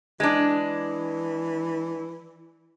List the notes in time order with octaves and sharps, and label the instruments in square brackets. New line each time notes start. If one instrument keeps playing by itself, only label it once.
[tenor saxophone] E3 [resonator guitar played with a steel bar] G#3 D4